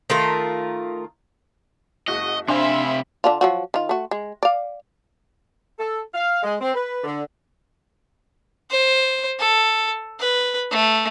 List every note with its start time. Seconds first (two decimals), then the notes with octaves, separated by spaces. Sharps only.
0.10 D#3 A3 F4 A#4
2.08 F#1 G#3 F#4 D#5
2.49 C3 D4 C5 E5 F5 G#5 B5 C6
3.24 D3 D4 F4
3.41 F3 F#3 F#4
3.74 D#3 F4
3.89 A3 F#4
4.11 G#3
4.43 D5 F5
5.79 A4
6.13 F5
6.43 G#3
6.60 C4
6.74 B4
7.04 D3
8.70 C5
9.39 A4
10.20 B4
10.71 A3